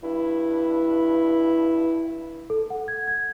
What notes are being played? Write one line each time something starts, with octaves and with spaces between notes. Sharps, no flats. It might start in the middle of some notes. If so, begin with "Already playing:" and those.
G2 E4
A4
F#5
G#6
G#6